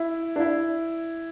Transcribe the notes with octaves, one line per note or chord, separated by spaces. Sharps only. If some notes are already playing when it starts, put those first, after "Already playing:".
Already playing: E4
D4
E4